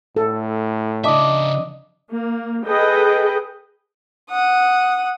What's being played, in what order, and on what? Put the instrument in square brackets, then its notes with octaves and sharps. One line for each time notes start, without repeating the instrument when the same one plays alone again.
[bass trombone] A2 [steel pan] A4
[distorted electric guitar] C#3 E5 [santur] D4 D#5 D6
[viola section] A#3
G#4 A4 B4 D#5 G5
[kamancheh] F#5 D#6